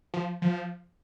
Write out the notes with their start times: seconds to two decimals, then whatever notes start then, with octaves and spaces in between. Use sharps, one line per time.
0.14 F3
0.42 F3